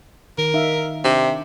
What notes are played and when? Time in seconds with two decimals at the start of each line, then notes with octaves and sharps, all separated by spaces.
0.38 D#3 A#4
0.54 D#4 E5 F5
1.04 C3 D4